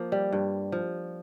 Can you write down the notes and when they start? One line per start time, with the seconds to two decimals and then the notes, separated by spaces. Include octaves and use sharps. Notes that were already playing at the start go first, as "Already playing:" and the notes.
Already playing: F3 A#3
0.12 G3
0.32 G2
0.72 F3